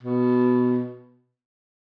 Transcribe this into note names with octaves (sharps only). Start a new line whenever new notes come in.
B2